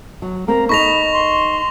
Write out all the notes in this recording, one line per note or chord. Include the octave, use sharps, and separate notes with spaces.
F#3
A#3 C4 A#5
D#4 A4 D#5 B5 C#6 A#6 F7
C6